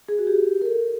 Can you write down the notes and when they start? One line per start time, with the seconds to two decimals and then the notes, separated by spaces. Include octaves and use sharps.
0.09 G#4
0.19 F#4
0.27 G4
0.61 A#4
0.66 A4